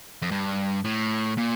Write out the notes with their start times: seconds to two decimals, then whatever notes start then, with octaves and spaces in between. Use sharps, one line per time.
0.22 F2
0.32 G2
0.85 A2
1.38 A#2